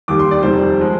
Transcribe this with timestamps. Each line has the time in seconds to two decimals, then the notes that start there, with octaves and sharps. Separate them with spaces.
0.08 D#2 D#3 G3 D6
0.19 C6
0.31 D5
0.43 F1 F2 D#3 G3 C5
0.79 F3 G#3